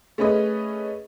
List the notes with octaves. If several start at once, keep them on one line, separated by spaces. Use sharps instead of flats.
A3 C#4 G#4 B4 D#5